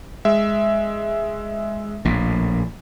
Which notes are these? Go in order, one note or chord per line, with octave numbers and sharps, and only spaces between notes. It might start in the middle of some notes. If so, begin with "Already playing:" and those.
G#3 E5
A#1 A2